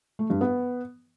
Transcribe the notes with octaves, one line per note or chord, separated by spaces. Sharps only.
A3
G2
B3